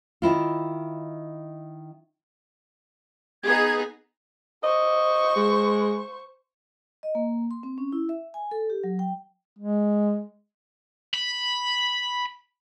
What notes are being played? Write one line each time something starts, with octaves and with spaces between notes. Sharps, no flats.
D#3 E4 F4
B3 D#4 G#4 G#6
C5 D#5 C#6
G#3
D#5
A#3
C6
C4
C#4
E4
E5
G#5
A4
G4
F#3
G5
G#3
B5